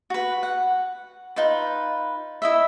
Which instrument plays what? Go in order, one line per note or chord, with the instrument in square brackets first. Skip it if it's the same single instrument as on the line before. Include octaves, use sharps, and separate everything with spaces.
[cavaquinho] F#4 B4
F#5
D#4 F4 B4
E4 D#5 E5